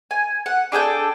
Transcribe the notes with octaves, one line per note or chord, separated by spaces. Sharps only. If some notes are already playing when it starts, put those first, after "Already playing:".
G#5
F#5
D4 G#4 A4 G5